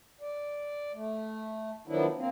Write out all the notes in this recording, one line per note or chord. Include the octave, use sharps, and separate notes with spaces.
D5
A3
D#3 F3 F#3 B3 D4 E4
A#3 C4